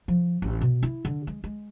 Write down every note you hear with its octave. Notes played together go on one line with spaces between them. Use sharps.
F3
A1
B2
E4
D3
G#3
G#3